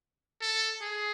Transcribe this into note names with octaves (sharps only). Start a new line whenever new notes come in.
A4
G#4